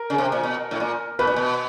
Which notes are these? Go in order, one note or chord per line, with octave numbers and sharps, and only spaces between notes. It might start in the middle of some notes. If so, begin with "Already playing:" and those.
Already playing: A#4
C#3
C3
A#2
B2
A2
A#2
B2 B4
A#2
B2